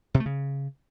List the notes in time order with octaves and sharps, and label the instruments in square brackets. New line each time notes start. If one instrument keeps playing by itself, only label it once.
[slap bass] C3
A3
C#3